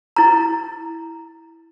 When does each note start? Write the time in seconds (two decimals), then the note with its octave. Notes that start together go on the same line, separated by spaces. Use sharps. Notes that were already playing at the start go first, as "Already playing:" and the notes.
0.16 E4 A#5